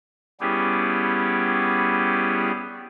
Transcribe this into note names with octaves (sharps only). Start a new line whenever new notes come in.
G3 B3 C#4 E4 G4 G#4